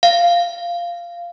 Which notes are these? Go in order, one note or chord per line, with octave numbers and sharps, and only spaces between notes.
F5